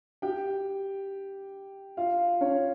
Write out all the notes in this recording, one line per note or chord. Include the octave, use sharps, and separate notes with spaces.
G4 G5
F4 F5
C#4 C#5